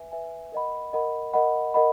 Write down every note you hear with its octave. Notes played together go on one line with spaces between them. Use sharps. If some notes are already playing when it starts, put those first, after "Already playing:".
Already playing: B4 E5 G#5
B4 E5 G#5
A#4 D#5 F#5 B5
A#4 D#5 F#5 B5
A#4 D#5 F#5 B5
A#4 D#5 F#5 B5